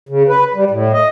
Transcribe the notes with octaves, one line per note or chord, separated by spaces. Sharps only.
C#3
B4
G3
A2
D#5